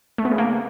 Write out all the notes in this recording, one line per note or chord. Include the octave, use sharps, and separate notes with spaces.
A3
B3
C#3
A#3